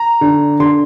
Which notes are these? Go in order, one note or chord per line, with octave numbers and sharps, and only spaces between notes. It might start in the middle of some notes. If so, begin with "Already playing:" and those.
Already playing: A#5
D3
D3 C6